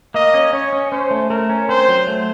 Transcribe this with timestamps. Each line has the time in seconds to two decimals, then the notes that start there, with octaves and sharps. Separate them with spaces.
0.14 A#3 D#5
0.34 C#4
0.53 C#4 C#5
0.73 C#4
0.92 C#4 C5
1.11 A3
1.30 A3 A#4
1.49 C#4
1.69 C4 C5
1.89 F#3
2.07 A3